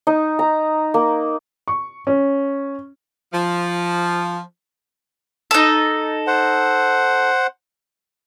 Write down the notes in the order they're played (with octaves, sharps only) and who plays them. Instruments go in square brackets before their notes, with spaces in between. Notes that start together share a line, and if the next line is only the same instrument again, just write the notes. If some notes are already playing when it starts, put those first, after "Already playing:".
[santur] D#4
A#5
A#3
[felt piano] C#6
C#4
[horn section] F3
[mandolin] D#4 A4
[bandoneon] C5 F#5